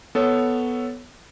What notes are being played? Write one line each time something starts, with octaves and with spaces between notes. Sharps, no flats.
B3 A4 C#5